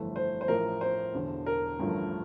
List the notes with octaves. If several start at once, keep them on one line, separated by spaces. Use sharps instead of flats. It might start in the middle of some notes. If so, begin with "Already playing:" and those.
Already playing: G1 F2 E3 A3
C5
C5
A1 A2 F3 A#4
C5
E1 E2 D3
A#4
A1 G2 D3 F3 A3